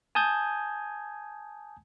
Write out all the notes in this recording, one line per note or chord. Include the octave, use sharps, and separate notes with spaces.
G#5 A5 D#6 G6 G#6